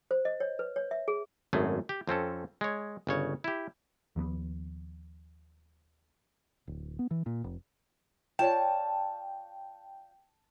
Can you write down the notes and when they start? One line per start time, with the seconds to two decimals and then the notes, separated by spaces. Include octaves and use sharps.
0.11 C5
0.25 D#5
0.40 C#5
0.59 B4
0.76 C#5
0.91 E5
1.08 G#4
1.53 G#1 F#2 A3 G#4
1.89 G4
2.07 F2 C4 C#4 A4
2.61 G#3 C#5
3.07 G1 C#3 C#5
3.44 E4 G4
4.16 D#2 F3 A#3 B3
6.67 D1
6.99 B3
7.11 E3
7.26 A#2
7.44 F1
8.39 F4 C#5 D5 G5 A5